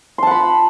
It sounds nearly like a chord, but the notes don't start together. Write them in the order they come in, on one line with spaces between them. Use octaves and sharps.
C6 A5 F#5 B5